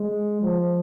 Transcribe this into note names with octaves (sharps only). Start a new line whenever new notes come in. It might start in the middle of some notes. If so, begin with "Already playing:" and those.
Already playing: G#3
F3